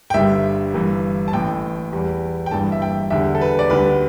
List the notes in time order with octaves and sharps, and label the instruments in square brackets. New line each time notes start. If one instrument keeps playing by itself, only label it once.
[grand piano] G5
G1 G2 D3 G3 E5
G1 G2 E3
A5
A1 A2 E3 G5
E2 E3 G3
G5
G1 G2 E3 G3 A5
E5
G5
E2 D3 G3 E5
A4
B4
D5
D2 D3 G3 B4